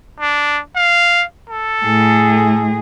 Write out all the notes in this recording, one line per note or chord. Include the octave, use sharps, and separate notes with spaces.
D4
F5
A4
A2 G#4